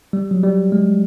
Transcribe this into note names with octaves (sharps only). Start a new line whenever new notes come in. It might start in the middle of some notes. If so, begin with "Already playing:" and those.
G3
F#3
G3
G#3